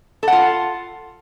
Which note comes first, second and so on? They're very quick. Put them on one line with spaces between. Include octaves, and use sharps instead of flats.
A4 F#5 F4